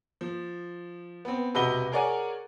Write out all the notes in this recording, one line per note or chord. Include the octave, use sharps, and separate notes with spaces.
F3
B3 C4
E1 C3 F#4 B4 D#5 G7
G#4 A#4 C#5 D5 F#5 G#5